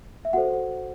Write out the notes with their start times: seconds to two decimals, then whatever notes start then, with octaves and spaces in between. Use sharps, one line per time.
0.25 E5
0.33 F#4 A4 C5 F#5